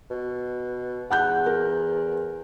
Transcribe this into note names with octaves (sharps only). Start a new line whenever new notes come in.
B2
E2 F#5 F#6 G6
A#4